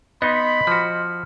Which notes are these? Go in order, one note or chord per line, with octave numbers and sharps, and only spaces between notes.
B3 D#4 D#5 B5 C6
F3 F#4 F6